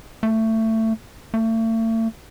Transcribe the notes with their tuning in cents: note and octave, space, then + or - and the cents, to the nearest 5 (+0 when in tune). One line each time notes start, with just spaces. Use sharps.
A3 +20
A3 +40